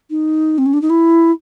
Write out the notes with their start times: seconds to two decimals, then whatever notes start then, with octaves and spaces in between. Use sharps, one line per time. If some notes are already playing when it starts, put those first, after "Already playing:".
0.10 D#4
0.58 C4
0.66 C#4
0.73 D4
0.82 D#4
0.90 E4